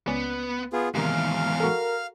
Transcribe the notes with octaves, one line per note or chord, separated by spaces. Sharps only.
C#2 B3 C#4 D5
B3 F4 G#4
E2 G#2 C3 D#3 A#3 D#4 F5 F6
F#4 A4 A#4